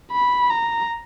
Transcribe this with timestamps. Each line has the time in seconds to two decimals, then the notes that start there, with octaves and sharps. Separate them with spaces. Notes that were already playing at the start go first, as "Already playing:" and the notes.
0.12 B5
0.50 A#5